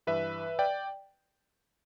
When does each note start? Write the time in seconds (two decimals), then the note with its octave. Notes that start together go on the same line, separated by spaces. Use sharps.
0.07 G2 E3 B4 E5
0.59 D5 G5